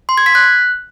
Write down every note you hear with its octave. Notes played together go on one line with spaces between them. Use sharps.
C6
G#6
B6
F#6